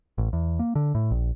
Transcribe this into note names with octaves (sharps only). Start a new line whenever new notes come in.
A1
E2
A#3
D3
A2
A#1